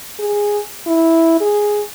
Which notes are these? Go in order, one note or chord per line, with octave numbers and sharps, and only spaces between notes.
G#4
E4
G#4